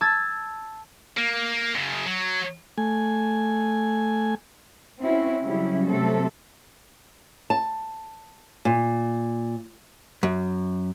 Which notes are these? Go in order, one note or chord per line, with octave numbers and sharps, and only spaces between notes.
A5 E6 G#6 A6
A#3
F#2 C#3
F#3
A3 G#5
C4 C#4 E4 F#4
C#3 F#3 G3 C#4 E4
C3 F#3 A3 C4 A4
A5
A#2
F#2